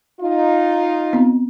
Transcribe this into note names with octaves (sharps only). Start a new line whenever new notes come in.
D#4 F4
B3 C4